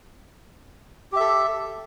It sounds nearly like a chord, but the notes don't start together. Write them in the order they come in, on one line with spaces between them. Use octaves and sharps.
G4 E5 A4